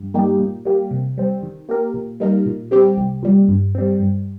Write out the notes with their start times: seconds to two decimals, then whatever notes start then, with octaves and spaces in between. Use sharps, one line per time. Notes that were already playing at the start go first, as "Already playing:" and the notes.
Already playing: G2
0.14 G3 A#3 D#4 G4
0.39 A#2
0.65 G3 A#3 G4
0.91 C3
1.18 G3 C4
1.43 D#3
1.69 A#3 G4 A#4
1.94 A#2
2.20 G3 A#3 D#4 A#4
2.46 A#2
2.71 G3 C4 G4
2.97 C2
3.23 A#2 G3
3.48 G2
3.75 G3 C4
4.00 G2